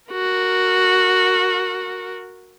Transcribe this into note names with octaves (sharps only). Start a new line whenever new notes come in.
F#4 A#4